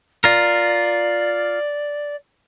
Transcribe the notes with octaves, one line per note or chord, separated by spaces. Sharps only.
F4 A#4 D5